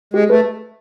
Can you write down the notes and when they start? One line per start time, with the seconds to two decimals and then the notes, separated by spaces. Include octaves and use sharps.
0.14 G#3 G4
0.30 A3 B4